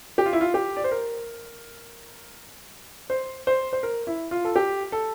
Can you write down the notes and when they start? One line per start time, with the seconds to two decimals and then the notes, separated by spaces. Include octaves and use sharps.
0.18 G4
0.26 F4
0.33 E4
0.41 F4
0.54 G4
0.77 D5
0.84 C5
0.92 A#4
3.10 C5
3.47 C5
3.73 C5
3.83 A#4
4.07 E4
4.31 F4
4.44 A4
4.56 G4
4.92 A4